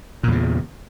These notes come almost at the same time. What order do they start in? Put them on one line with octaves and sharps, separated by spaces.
A#2 E2 C#3